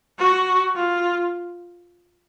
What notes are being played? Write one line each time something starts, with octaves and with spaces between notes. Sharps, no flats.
F#4
F4